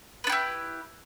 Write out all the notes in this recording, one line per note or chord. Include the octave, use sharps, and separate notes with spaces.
D4 E4 G4 B4